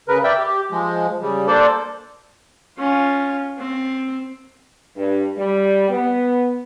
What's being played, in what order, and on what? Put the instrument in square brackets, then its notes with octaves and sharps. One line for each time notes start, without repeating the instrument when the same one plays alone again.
[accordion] C#3 A#4 B4
D5 E5 G5
G4
F3 G#3
C#3 G3
A#3 D4 A4 C5 D5
[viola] C#4 F4
C4
[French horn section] G2
G3
B3